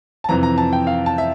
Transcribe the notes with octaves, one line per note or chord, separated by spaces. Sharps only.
A5
F2 C3 E3 A#5
A#5
A5
G5
F5
A5
E5